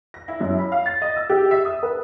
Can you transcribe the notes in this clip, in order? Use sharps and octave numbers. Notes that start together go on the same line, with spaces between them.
A#6
E4
F#2
B5
F5
A6
D#5
E6
G4
E5
D#6
B4